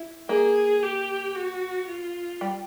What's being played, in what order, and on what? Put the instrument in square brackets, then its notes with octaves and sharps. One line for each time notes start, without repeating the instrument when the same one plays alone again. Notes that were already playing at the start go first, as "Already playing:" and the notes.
Already playing: [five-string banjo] E4
[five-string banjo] A#3 [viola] G#4
[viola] G4
F#4
F4
[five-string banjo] G3